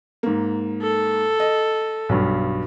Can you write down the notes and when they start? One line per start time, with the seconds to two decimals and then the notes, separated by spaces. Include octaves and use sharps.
0.23 G#2 A#3
0.82 A4
1.40 D#5
2.09 B1 G2